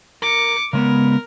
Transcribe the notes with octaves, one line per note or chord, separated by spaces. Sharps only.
A#4 D6 C#7
C#3 G#3 B3 A#4